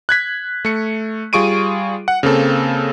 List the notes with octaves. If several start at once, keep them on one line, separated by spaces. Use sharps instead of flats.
F#6 G#6 B6
A3 C#7
G3 F4 G#4 C#6 D7 D#7
F#5
C#3 A#3 C4 A4